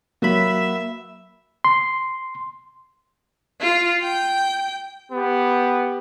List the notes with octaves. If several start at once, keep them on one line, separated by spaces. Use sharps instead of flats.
F#3 A#3 B3 E5 B5
C6
F4
G5
B3 G4